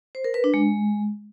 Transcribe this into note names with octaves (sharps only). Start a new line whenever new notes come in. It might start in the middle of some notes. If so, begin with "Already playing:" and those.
C5
A#4
B4
D4
G#3